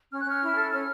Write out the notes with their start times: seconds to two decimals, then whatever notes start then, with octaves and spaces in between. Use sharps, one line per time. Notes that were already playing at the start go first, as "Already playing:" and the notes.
0.10 C#4 F6
0.20 F#6
0.26 C#4 F6
0.41 E4
0.56 A4
0.72 C#4 F6